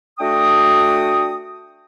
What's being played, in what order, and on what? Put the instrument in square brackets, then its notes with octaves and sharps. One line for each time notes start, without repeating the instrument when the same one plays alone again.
[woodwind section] A3 D4 F#4 G5 D#6